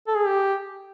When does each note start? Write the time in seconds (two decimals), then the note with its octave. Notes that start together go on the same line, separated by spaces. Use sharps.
0.07 A4
0.16 G#4
0.27 G4